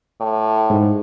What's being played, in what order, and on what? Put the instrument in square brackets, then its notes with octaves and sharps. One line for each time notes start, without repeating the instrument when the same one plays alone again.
[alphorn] A2
[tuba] G#2